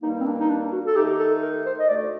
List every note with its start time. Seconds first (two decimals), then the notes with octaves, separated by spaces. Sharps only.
0.02 G2 D#3 G3 A#3 D#4
0.20 C4
0.26 D4
0.40 D#4
0.49 D4
0.72 F#4
0.86 A4
0.96 D#3 A3 D#4 G4
1.19 A4
1.42 A#4
1.66 C5
1.79 D#5
1.89 D2 D3 A3 D5